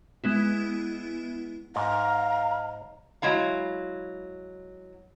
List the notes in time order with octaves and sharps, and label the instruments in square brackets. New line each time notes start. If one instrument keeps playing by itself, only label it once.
[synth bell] G#3 B3 E4
[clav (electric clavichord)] G#2 [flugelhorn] F5 [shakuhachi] A#5
[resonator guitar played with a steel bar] F#3 G#3 E4 F5